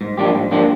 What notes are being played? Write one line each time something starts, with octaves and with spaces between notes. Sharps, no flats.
G#2
F3 A#3 D4 G4
G#2
F3 A#3 D4 G4